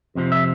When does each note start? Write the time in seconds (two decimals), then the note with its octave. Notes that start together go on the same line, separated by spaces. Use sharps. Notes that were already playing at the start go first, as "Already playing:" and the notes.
0.15 F2 C3 F3
0.32 E5